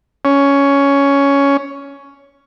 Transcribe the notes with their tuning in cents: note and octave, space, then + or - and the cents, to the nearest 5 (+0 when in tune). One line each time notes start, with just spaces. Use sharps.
C#4 +10